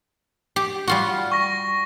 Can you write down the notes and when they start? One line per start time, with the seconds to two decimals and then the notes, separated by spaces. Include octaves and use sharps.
0.56 G4
0.87 G3 F4 F#4
1.32 C#6 A#6